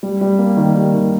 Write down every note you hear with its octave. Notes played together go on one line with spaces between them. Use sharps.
G3
G3
A#3
D#3
G3
D#3